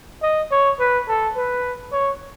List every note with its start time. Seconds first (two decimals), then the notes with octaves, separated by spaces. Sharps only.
0.23 D#5
0.51 C#5
0.80 B4
1.08 A4
1.36 B4
1.92 C#5